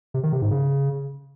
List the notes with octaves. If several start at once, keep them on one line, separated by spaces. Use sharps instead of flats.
C3
D#3
C3
G#2
C#3